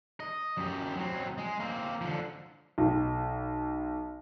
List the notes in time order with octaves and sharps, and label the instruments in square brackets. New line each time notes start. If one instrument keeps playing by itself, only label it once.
[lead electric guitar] D#5
F#2 G4
F#3 C4
G#3
A#3 C4
D3 F3
[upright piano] B1